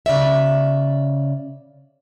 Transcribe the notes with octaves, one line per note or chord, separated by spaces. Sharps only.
C#3 D5 E5